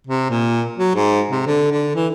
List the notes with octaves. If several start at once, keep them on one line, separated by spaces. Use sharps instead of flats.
C3
A#2
F#3
G#2
C3
D3
D3
E3